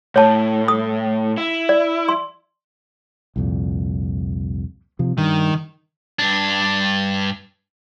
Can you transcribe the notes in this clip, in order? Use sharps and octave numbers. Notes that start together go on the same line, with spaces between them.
A2 C#5 A5
D#6
E4
D5
C6
C2 F2 A#2
C3 F3
G2 D#3
G2 D4